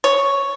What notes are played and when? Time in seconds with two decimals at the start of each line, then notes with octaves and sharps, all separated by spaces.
0.04 C#5